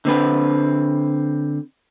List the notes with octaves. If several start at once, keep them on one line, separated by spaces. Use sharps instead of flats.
D3 C4 B4